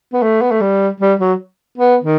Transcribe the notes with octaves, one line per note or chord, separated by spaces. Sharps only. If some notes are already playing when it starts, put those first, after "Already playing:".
B3
A3
B3
A3
G3
G3
F#3
B3
D#3